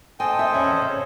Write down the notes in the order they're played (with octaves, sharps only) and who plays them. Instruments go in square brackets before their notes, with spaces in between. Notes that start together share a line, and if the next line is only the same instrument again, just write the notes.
[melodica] A4 C5 D#5 [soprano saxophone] G5 [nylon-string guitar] G#5
[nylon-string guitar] E5
[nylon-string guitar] E2 [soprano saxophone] C#4
[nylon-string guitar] C#3